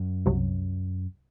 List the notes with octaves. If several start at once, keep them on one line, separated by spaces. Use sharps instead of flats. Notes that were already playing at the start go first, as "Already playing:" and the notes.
Already playing: F#2
C2 C3 F#3